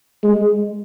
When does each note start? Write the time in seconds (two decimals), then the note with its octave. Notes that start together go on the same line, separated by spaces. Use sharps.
0.23 G#3